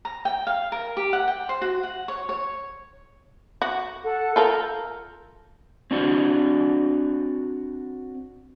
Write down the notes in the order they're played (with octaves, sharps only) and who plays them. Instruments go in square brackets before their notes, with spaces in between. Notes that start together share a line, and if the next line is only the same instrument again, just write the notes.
[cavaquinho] A#5
G5
F5
A#4
G4
F#5
G5
C5
F#4
F#5
C#5
C#5
[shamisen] F#4
[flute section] A4 F#5
[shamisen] F4 A4 A#4 [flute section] A#5 F6 G6
[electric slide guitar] C4 D4 F#4